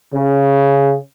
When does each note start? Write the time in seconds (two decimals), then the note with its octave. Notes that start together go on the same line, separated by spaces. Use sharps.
0.14 C#3